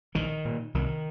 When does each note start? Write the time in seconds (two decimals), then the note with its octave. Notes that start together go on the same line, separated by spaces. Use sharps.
0.15 A#1 D#3
0.45 A#2
0.74 C2 D#3